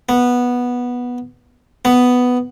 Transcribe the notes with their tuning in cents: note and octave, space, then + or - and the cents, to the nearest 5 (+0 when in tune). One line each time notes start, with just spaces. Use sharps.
B3 -10
B3 +5